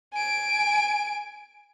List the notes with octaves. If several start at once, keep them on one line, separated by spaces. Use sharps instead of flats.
G#5 D7